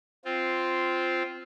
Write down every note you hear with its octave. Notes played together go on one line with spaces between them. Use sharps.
C4 F4